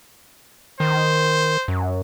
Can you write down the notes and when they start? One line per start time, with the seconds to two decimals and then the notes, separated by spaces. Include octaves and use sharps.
0.80 D#3 C5
1.68 F#2